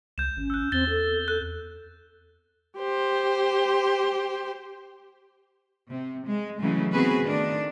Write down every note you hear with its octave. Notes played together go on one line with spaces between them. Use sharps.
C#2 G6 E7
G#1 C#4
E6 F#6
E2 C4 A6 G7
A4
A4 F#6
G4 C5
C3
G#3
C#3 E3 F#3 G#3 A3
D#3 B3 C4 F#4 G#4 B4
D#3 A3 D4